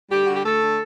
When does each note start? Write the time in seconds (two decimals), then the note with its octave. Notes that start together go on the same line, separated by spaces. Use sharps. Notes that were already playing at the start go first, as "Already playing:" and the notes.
0.11 D2 G3 G4
0.25 D3 F#4
0.35 G4
0.45 D2 A3 A4
0.61 D3